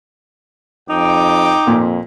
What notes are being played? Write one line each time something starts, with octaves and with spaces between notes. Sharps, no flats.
F2 D#4 G5 D6
F2 A#2